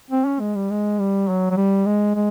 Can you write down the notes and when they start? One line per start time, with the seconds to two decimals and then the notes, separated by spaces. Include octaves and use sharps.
0.10 C4
0.25 C#4
0.40 G#3
0.55 G3
0.70 G#3
0.99 G3
1.28 F#3
1.50 F#3
1.57 G3
1.86 G#3
2.15 G#3